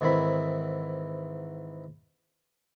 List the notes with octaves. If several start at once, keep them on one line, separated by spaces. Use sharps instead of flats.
G#2 D#3 E3 C4 E4 B5